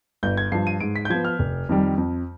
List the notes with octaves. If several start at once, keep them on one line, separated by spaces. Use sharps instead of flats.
G1 G6
G#6
G2 F3 C7
D#7
G#2 D7
B6
G6
F3 B3 G#6
F6
F1
F2 D#3 G3
F2